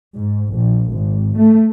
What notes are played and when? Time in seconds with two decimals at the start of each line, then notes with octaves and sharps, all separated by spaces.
0.16 G#2
0.52 A#1
0.89 G#1
1.37 A3